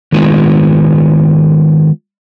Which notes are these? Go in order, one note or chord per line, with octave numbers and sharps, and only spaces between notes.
D#3 G#3 B3 F4